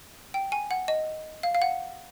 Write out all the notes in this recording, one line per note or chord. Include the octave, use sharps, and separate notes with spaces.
G5
G#5
F#5
D#5
F5
F5
F#5